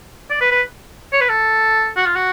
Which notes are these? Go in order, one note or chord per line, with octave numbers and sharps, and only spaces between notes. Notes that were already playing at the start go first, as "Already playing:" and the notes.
D5
B4
B4
C#5
B4
A4
F#4
F4
F#4